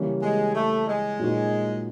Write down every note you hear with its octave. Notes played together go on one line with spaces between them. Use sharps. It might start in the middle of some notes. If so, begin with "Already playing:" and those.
Already playing: C#3 E3 G3 A#3 C#4
G#3
A3
G#3
A#2 F#3 A#3 D#4 F#4